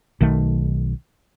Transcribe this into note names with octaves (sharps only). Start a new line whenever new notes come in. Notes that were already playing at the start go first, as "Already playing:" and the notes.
B1 D#3 A3